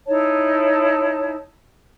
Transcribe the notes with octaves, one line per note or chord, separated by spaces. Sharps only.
D#4 E4 C#5 A5